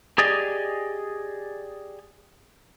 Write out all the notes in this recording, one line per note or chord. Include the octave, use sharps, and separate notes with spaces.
G4 G#4 D5 D#5